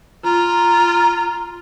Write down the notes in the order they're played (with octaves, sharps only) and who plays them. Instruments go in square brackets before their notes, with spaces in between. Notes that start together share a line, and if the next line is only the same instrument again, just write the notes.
[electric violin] F4 [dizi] A#5